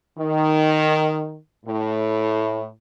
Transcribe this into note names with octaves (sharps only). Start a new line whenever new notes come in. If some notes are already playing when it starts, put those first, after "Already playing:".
D#3
A2